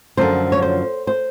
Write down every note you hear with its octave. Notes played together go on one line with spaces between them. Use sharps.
F#2 D3 F3 C5
C#5
C5
C5